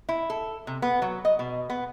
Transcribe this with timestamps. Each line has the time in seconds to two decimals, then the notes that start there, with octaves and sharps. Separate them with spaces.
0.09 E4
0.30 A4
0.67 C3
0.82 B3
1.02 F#3
1.25 D#5
1.39 B2
1.70 B3